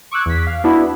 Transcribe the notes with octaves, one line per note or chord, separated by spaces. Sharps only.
C#6 D6 E6 F#6 G#6
E2 B6
F5
B3 D4 E4 F#4